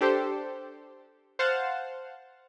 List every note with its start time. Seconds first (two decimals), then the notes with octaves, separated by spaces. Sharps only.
0.01 D4 G4 A4 C5
1.39 C5 F5 F#5 A5 E7